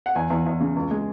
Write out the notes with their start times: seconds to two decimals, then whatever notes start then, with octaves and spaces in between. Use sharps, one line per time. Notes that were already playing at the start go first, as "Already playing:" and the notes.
0.06 F#5
0.15 E2 G#5
0.30 E2
0.46 E2
0.60 C#3
0.76 C#2
0.91 G#3